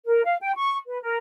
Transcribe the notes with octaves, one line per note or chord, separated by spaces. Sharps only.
A#4
F5
G5
C#6
B4
A#4